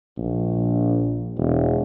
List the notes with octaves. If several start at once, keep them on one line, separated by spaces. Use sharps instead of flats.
A#1
E1